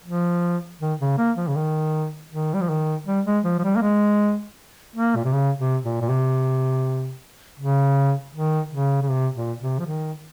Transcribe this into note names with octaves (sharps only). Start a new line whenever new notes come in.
F3
D#3
C#3
A#3
F3
C#3
D#3
D#3
G3
F3
D#3
G3
G#3
F3
F3
G3
A#3
G#3
A#3
A#2
C3
C#3
C3
A#2
A#2
C3
C#3
D#3
C#3
C#3
C3
A#2
C3
F3
D#3